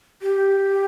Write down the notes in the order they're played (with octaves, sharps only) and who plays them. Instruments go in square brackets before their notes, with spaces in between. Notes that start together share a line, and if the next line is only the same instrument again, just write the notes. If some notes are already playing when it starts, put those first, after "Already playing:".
[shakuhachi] G4